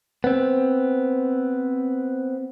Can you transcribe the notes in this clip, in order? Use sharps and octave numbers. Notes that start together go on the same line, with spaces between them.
B3 C4